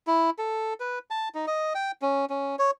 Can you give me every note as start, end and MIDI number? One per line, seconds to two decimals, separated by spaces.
0.07 0.30 64
0.38 0.74 69
0.80 0.99 71
1.10 1.29 81
1.35 1.46 63
1.47 1.73 75
1.75 1.91 79
2.02 2.25 61
2.30 2.56 61
2.59 2.71 73